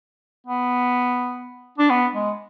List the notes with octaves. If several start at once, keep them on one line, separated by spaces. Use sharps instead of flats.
B3
D4
B3
G#3